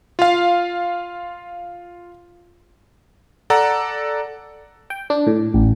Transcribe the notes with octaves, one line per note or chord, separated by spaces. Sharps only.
F4 F5
A4 D5 F#5 A#5
G5
D4
A2
A1